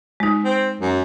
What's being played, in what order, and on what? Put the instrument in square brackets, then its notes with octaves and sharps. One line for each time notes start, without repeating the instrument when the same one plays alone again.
[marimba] G#3 D#4
[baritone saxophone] C4
F#2